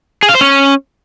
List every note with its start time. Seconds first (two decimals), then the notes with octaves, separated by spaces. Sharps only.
0.23 G#4
0.29 F5
0.35 C5
0.41 C#4